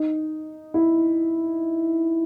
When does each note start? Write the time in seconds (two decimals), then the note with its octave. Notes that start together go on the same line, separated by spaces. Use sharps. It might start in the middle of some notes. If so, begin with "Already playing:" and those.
Already playing: D#4
0.74 E4